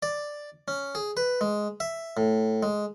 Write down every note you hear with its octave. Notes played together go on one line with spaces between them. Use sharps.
D5
C#4
G#4
B4
G#3
E5
A2
G#3